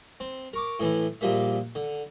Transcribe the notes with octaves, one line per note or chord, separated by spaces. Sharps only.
C4
A#4 C#6 D6
A2 E3 E4
A#1 F3 G3 A#3 E5
D3